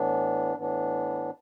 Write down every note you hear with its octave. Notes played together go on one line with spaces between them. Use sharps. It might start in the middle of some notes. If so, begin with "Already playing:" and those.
Already playing: A2 E3 B3 D4
A2 E3 B3 D4